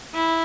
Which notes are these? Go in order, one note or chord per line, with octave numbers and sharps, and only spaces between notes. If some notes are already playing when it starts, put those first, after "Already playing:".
E4